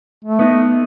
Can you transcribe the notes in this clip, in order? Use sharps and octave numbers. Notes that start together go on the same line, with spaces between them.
A3
B3 D#4